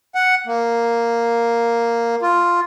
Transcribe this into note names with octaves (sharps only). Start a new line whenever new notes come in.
F#5
A#3
F4